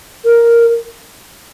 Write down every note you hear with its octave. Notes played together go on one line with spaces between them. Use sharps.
A#4